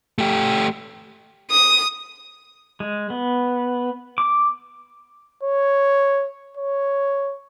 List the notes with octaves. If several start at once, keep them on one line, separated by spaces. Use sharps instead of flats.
A3 G4
D#6
G#3
B3
D6
C#5
C#5